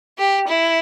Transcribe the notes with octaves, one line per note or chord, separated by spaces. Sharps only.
G4
E4